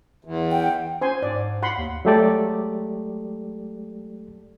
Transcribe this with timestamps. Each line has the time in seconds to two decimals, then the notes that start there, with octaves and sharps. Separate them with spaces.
0.25 E2
0.52 F#5 G5
1.01 C#4 C5 G#5 C6
1.23 G#2 D5
1.63 F#5 B5 C6
1.78 D#2
2.05 F#3 G#3 A3 G4 A4 D5